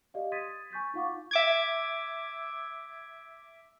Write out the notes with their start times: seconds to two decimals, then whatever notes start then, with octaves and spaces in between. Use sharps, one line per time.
0.14 G4 D5 D#5 F5
0.32 C6 D#6 G#6 A6 B6 D#7
0.71 G#5 C#6 G6 A6 B6
0.94 D#4 F4 F5 F#5 C#6 D6
1.31 E5 D6 G#6